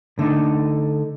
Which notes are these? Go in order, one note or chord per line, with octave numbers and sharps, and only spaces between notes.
D3 A3 D#4